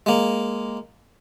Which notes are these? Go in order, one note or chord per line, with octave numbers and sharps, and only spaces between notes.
G#3 A#3